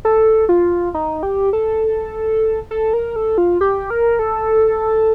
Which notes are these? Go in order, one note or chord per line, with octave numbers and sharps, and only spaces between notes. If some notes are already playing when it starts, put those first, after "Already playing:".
A4
F4
D#4
G4
A4
A4
A#4
A4
F4
G4
A#4
A4